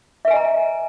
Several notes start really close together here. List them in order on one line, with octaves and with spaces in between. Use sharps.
E5 B4 G#5 D#5 A#5